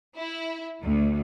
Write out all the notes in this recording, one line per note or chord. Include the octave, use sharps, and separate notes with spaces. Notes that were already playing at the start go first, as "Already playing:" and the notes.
E4
D2